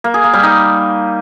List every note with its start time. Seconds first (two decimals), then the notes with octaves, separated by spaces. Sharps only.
0.04 A#3
0.14 G#4
0.24 A#3
0.34 G3
0.43 D#4